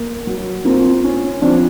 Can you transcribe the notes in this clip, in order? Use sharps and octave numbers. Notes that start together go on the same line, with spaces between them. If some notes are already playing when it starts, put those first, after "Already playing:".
Already playing: A#3
F#3
A#3 C4 F4
C#4
F3 C4 D4